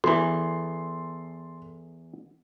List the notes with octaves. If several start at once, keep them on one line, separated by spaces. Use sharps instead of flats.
E2 E3 A4 C6